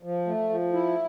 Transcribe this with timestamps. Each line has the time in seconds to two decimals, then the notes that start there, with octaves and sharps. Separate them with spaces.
0.03 F3
0.27 A3
0.50 F3
0.73 E4